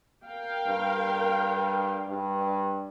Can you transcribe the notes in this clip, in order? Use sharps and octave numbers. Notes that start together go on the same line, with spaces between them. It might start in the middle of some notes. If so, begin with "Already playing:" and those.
A#4 F5 G5
G2
G2